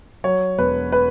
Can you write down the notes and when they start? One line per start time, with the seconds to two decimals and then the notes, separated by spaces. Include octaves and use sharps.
0.24 F#3 C#5
0.58 E1 B4
0.92 B4